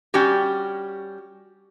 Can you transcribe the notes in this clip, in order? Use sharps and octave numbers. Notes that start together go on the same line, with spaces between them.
G3 C#4 F#4 G4